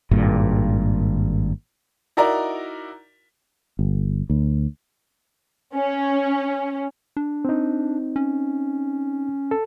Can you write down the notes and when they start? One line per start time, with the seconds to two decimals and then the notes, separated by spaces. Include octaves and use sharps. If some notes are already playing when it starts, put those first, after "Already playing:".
0.11 G#1 G2 A#2
2.17 D#4 E4 F#4 A#4 D5 A#5
3.79 G1
4.30 D2
5.75 C#4
7.17 D4
7.45 C4 D#4
8.16 C#4
9.51 A4